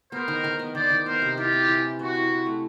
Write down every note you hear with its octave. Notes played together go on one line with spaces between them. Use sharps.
B3 A#4 C5
D#3
D#3
B3
D#3 C5 D5
D#3
B3 A#4 C5
C3
E4 F4 G4
C4
E3
C4
C4 F#4
E4
C4
A3